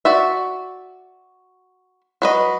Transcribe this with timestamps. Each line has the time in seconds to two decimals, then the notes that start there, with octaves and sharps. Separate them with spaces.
0.05 F#4 D5 E5
2.22 F#3 B4 D#5